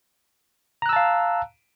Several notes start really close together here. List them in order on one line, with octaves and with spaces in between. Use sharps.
A#5 F#6 E6 A5 F5